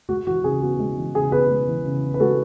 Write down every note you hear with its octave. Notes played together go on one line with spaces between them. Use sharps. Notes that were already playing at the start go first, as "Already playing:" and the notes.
G#3 F#4
E3 F#4
C#3 G#4
B3 F#4
G#3
E3
C#3 G#4
B3 G#4 B4
G#3
E3
C#3
B3
B4
G#3 F#4 A4